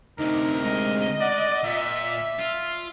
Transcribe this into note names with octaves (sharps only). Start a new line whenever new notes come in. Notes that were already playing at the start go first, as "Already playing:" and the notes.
D2 C3 D#4 A#4
G#3 D#5
D5 F#5
A#2 E5 B6
F4